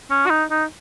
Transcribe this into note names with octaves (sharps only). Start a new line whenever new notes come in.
C#4
F#4
D#4
D#4